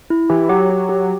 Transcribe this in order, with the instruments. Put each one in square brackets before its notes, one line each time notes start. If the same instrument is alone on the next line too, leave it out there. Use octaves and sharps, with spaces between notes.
[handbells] E4
[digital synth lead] E3 [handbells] G4
[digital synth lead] F#3 [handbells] G4
[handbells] G4
G4